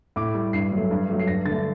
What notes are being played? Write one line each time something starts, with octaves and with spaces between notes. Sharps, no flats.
A2 D6
G3
G2 C7
F#3 A3
G2
F#3 A3
C7
G2 A#6
D3 A3 A6